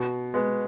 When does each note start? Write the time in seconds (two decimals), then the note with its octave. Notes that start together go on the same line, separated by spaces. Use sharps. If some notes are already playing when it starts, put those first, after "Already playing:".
Already playing: B2
0.34 G#3 B3